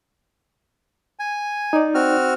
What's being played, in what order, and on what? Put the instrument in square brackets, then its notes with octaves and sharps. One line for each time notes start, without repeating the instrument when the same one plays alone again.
[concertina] G#5
[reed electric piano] D#4 D5
[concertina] C4 F#4 F6